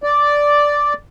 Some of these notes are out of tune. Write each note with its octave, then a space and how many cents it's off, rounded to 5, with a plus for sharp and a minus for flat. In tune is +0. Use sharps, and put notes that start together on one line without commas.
D5 -5